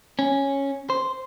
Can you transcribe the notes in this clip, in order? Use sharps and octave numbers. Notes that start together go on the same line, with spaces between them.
C#4
C5